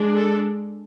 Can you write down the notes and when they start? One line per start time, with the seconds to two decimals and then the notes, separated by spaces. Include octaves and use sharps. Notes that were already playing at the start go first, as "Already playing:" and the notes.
Already playing: G#3 D4
0.16 A4